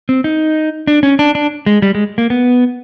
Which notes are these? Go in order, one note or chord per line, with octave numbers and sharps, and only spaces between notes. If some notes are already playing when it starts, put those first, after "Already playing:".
C4
D#4
D4
C#4
D4
D4
G#3
G3
G#3
A#3
B3